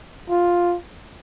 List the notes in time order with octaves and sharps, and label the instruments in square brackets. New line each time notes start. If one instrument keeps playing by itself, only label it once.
[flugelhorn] F4